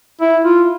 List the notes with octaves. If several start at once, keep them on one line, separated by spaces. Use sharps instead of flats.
E4
F4